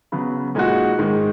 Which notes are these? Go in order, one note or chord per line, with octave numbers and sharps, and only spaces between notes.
C#3 F#3 B3
A#2 G#3 D#4 F#4
G#2 D#3 G#3